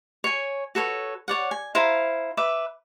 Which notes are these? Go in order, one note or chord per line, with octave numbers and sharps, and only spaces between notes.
C#5 G#5
F#4 A4 B4 C#5
C#5 D5 F#5
G#5
E4 C5 F5 A#5
B4 E5 D6